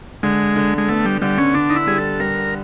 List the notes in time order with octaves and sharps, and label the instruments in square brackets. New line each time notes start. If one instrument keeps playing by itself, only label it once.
[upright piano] D3 [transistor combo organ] G#3
[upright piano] D3
[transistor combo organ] G#3
[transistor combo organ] A3 [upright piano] B3
[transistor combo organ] G3
[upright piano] D3 [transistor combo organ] G3
[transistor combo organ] C#4
[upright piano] D3 [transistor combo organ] D4
[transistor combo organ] D#4
E4
[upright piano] G3 [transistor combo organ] G#4
[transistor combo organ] A4
[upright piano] G3 [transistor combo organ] A#4